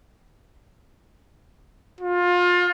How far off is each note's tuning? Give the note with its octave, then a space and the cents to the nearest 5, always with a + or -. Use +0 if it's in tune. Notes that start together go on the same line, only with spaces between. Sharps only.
F4 +25